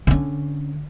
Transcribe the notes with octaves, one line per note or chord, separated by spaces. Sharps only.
D3 C#4